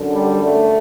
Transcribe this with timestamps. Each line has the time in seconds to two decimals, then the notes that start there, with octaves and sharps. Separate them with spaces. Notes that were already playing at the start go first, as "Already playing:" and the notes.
Already playing: F#2 D3
0.11 G3
0.40 A3